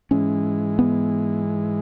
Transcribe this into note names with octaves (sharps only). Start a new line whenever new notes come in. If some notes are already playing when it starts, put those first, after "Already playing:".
G#2 E3 G#3 C#4
B3